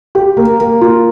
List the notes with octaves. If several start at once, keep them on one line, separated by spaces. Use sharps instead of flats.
G4
A#3
A#3
F4